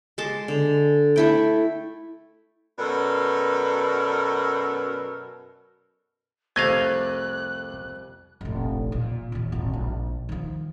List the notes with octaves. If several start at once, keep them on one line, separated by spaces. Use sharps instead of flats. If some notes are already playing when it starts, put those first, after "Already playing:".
G#3 A5 C6 D6
D3
A3 E4 G5
F#2 B2 A4 A#4 D5
C2 F2 C3 A3 D#5 F5 F#6 G#6
F1 A#1
A#2
D#2 A#2
G#1 F4
A#1
D#3 F3